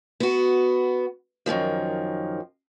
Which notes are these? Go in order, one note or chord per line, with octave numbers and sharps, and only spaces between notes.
B3 F#4
F#2 A#2 D#3 F3